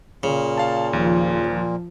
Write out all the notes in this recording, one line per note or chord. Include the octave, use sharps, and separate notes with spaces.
A#2 C#3
F5 A5
D#2 F3